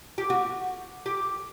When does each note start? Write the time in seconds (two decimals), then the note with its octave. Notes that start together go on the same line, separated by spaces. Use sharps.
0.18 G4
0.30 F#4
1.06 G4